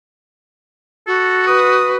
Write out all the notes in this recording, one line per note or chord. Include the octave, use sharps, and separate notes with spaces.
F#4 A4
B4 D#6